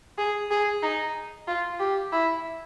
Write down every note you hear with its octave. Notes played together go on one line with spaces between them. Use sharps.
G#4
G#4
D#4
F4
G4
E4